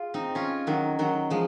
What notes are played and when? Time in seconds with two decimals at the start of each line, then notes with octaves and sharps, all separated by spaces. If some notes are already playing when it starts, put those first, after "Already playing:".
Already playing: F4 G#4
0.14 C4 D#4
0.35 C#4 F4
0.67 D#3 F#3
0.99 D#3 F#3
1.30 F3 G#3